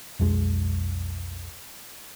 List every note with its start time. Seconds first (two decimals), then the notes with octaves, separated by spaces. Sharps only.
0.20 B1 F2 G#3